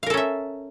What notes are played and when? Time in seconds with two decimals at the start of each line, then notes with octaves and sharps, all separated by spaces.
0.03 F5
0.06 A#4
0.10 A4
0.14 C#4
0.17 E5